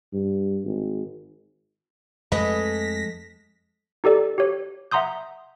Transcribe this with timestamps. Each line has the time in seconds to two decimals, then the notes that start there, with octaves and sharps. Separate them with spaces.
0.13 G2
0.65 G#1
2.32 F2 G#3 A3 A4 B4 D#5 A#6 B6
4.04 D#4 G4 A4 D5
4.38 G4 C#5
4.91 E5 F#5 A#5 C6 D#6 G6